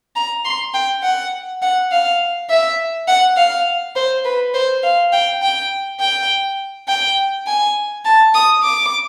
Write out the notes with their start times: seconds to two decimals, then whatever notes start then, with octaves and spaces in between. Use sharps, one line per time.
0.16 A#5
0.45 C6
0.74 G5
1.03 F#5
1.62 F#5
1.91 F5
2.50 E5
3.08 F#5
3.37 F5
3.96 C5
4.25 B4
4.54 C5
4.83 F5
5.13 G5
5.42 G5
6.00 G5
6.88 G5
7.47 G#5
8.05 A5
8.34 D#6
8.63 D6